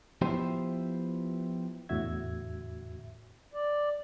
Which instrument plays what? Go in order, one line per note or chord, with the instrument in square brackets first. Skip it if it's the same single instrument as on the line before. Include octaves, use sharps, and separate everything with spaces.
[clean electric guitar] F3 B3 E4 G4 C5
[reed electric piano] E2 A2 D3 F#4 E5 G#6
[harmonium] D5